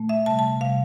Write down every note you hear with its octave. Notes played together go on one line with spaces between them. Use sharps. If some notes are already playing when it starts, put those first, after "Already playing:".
Already playing: A#2 A3
E5
C3 G3 A5
A5
C3 G3 F5